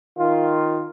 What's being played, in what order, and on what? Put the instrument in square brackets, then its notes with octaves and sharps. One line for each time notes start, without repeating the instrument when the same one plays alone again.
[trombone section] D#3 F4